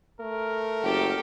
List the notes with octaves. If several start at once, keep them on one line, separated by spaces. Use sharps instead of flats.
A3 A#4
F#1 G4 A4